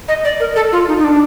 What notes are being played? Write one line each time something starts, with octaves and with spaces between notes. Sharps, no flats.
D#5
D5
A#4
A4
F4
D#4
D#4
D4